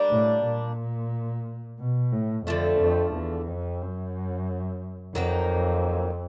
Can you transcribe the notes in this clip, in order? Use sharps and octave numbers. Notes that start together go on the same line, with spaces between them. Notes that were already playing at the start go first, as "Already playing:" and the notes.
Already playing: G3 A#3 D4
A2
A#2
B2
A2
F2 D3 F3 A3
F2
E2
F2
F#2
F2 D#3 F#3 A#3